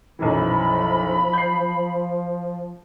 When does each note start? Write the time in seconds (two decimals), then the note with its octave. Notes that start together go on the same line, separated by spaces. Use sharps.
0.19 B1 F#2 E3 F3 B5
1.33 G6 C7